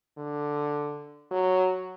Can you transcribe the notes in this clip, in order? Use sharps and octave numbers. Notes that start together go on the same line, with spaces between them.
D3
F#3